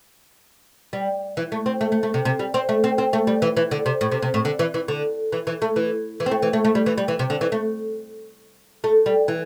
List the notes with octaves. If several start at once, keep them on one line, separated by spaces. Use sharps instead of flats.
G3
E3
A3
C4
A3
A3
A3
C3
C3
G3
C4
A3
C4
C4
A3
G3
E3
E3
D3
C3
A2
C3
C3
A2
D3
E3
E3
D3
E3
E3
A3
E3
E3
C4
A3
E3
A3
A3
G3
E3
G3
E3
C3
D3
E3
A3
A3
G3
E3